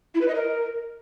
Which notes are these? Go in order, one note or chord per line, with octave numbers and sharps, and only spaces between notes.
E4
B4
D#5
A#4